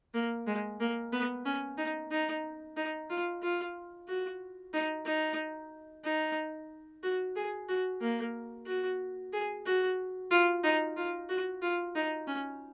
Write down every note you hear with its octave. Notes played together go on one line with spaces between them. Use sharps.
A#3
G#3
A#3
B3
C#4
D#4
D#4
D#4
F4
F4
F#4
D#4
D#4
D#4
F#4
G#4
F#4
A#3
F#4
G#4
F#4
F4
D#4
F4
F#4
F4
D#4
C#4